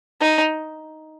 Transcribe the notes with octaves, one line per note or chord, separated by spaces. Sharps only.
D#4